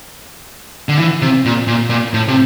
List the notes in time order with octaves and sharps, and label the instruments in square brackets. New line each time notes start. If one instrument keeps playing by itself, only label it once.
[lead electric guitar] D3
E3
C3
A#2
A#2
A#2
A2
C3